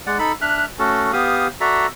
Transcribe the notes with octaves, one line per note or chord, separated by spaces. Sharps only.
G#3 D5 F#5
D#4 A4 B5
D4 E5 F6 F#6
A3 C#4 F#4 A4
B3 G4 F5 D#6
F#4 A4 D5 E5 A#5